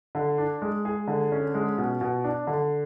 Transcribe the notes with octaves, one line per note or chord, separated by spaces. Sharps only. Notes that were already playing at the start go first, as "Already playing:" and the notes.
D3
D4
G#3
G#4
D3
C#4
G#3
B2
B2
D4
D3